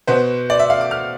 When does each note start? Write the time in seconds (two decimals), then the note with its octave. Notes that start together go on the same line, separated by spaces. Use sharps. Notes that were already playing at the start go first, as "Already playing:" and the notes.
0.07 B2 B3 C5
0.50 D5
0.59 E5
0.70 F5
0.81 D6
0.91 F6